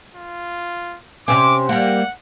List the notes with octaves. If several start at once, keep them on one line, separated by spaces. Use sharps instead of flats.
F4
C3 C4 C#4 D6
G3 A#3 F#5